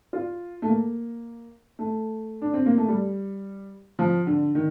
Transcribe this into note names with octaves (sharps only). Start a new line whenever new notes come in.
F4
A3
A#3
A3
D4
C4
A#3
A3
G3
F3
D3
D#3